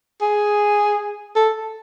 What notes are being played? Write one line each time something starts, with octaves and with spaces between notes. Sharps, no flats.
G#4
A4